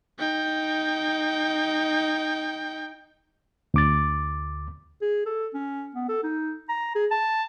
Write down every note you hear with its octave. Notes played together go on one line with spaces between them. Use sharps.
D#4 G5
D2 D6 A6
G#4
A4
C#4
B3
A4
D#4
A#5
G#4
A5